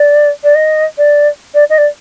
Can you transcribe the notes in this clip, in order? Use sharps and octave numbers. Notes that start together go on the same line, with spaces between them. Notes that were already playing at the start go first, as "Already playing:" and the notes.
Already playing: D5
D5
D#5
D5
D5
D#5
D5